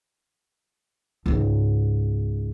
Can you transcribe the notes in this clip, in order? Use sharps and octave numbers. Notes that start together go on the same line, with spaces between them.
C#2 G#2